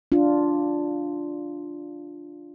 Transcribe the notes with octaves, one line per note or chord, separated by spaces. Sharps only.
D4 F4